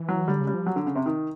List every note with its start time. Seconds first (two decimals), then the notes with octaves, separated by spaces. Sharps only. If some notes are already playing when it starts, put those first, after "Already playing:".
Already playing: E3
0.09 F#3
0.28 D3 G3
0.41 C#3
0.47 G3
0.54 F3
0.66 F#3
0.76 D3
0.86 C#3
0.96 C3
1.06 D#3